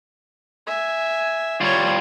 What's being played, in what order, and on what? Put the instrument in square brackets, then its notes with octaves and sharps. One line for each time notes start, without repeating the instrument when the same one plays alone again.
[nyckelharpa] E5 G#5
[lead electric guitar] G3 F4 [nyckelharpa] C#5